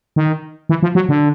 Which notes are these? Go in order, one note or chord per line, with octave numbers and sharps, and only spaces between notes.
D#3
E3
F3
F#3
D3